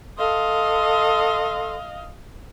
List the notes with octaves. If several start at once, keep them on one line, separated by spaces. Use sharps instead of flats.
A4 D#5 F5 C6